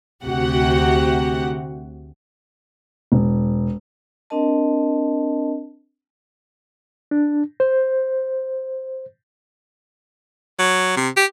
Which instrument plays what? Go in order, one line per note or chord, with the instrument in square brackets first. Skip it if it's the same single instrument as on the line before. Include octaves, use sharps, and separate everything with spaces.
[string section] D2 C3 F#4 G4 F#5
[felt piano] E1
[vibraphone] C4 D4 A#4 D#5 A5
[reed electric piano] D4
C5
[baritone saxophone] F#3
C3
G4